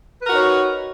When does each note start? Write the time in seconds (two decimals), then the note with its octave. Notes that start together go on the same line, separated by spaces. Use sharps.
0.22 B4
0.25 A#4
0.28 F#4
0.32 D#4
0.35 C#5